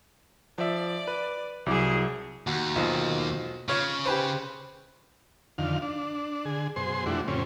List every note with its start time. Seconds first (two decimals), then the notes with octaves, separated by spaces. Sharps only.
0.58 F3 D5 E5
1.08 B4
1.66 C2 F#3 E4 G#4 D6
2.47 D#2 F#4
2.76 B1 B2 F3
3.69 C#3 F4 C#5
4.05 G4 B4 C5
5.58 F2 D3 D#3 F5
5.82 D4
6.45 D3 G#4
6.76 F#2 B2 G#4 C5 C6
7.06 F2 G3 A3 D4 E4 F#4
7.28 F2 A2 C#3 G3 C4 C#4